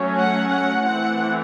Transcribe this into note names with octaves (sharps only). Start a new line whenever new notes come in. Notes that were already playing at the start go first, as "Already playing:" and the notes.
Already playing: F#3 A3 C#4
F#5
F#5
E3 A3 C4 F#5